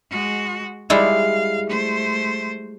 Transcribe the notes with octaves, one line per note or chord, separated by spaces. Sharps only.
G#3 F#4
G3 G#3 E4 F5
A3 C5